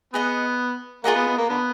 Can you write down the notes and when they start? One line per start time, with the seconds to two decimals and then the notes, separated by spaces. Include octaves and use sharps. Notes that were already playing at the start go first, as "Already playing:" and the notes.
0.13 B3 G#4 D#5 F#5
1.04 A#3 F4 G#4 D#5 F#5
1.16 B3
1.27 B3
1.38 A#3
1.49 D3 B3